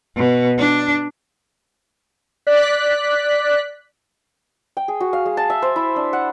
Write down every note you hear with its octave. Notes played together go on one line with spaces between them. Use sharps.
B2
D4
D5 F#6 B6
G5
G#4
F#4
F5
G#3
A5
E5
C5
E4
D4
F#5